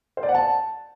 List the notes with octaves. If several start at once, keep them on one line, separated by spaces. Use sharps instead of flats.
C5
D5
F#5
A5